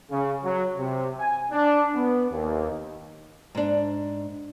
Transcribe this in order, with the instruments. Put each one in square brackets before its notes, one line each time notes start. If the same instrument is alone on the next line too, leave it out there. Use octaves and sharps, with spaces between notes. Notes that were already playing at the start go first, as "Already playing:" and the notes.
[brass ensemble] C#3
F#3
C3
G#5
D4
B3
D#2
[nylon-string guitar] G#2 D4